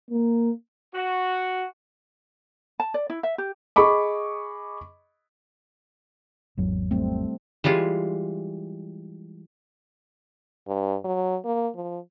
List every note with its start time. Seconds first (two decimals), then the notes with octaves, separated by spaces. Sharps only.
0.11 A#3
0.93 F#4
2.80 A5
2.94 D5
3.10 E4
3.23 E5
3.38 G4
3.76 G#4 D#5 B5 C#6 D6
6.57 G#1 E2 F#3
6.91 G3 A3 C4
7.64 E3 G3 G#3 F4
10.68 G2
11.04 F#3
11.45 A#3
11.75 F3